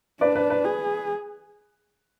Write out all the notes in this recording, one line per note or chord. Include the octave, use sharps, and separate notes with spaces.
D4 B4 D5
B4
B4
G#4